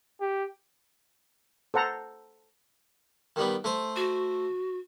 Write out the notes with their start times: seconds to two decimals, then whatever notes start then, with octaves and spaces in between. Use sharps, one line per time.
0.21 G4
1.74 A4 C5 F#5 A#5
3.36 D#3 G3 B3
3.64 A3 C5
3.96 F#4